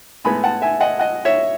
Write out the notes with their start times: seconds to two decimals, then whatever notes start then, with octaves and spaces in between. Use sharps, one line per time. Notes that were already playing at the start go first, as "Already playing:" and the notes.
0.25 A2 G#3 B3 G#5 B5
0.44 F#5 A5
0.62 E5 G#5
0.81 D#5 F#5
0.99 D#5 F#5
1.25 C#5 E5